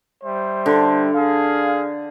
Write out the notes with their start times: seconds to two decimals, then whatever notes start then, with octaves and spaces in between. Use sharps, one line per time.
0.24 G3 C5 E5
0.66 D3
1.13 G#4 F5